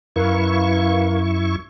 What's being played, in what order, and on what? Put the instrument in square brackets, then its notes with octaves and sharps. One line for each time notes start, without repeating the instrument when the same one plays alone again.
[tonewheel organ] F#2 E4 C#6 [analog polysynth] A#4 B4 F5